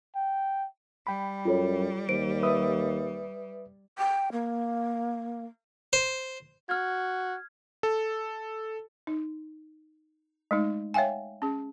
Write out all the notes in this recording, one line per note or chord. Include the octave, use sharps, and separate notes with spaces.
G5
G3 G5 B5
F#2 F4 A4 C#5
D#2 C5 D7
B4 E5 D#6
G5
A#3
C5
F#4 F6 G#6
A4
D#4
G#3 A3 D#4
C#5 E5 F5 G5 G#5
C#4 G#4